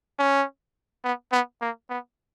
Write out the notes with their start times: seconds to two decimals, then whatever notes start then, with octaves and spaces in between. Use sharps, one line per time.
0.19 C#4
1.04 B3
1.32 B3
1.62 A#3
1.90 B3